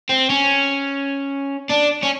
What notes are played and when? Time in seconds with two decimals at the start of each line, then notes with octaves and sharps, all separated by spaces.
0.09 C4
0.30 C#4
1.70 D4
2.03 C#4